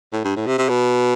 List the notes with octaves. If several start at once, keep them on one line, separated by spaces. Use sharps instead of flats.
A2
G2
A2
C3
C3
B2